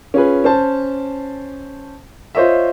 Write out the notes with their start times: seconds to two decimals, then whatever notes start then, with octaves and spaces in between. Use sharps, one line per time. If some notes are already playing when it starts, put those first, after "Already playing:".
0.14 C#4 F4 G#4 B4
0.44 C#4 C5 A5
2.35 F4 C5 C#5 D#5 E5